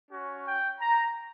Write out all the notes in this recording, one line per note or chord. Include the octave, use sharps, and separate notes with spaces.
C#4 F#4
G5
A#5